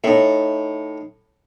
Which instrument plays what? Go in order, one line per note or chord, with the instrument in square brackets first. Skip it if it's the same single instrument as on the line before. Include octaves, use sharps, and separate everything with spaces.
[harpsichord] A2 [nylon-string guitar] D#4 E5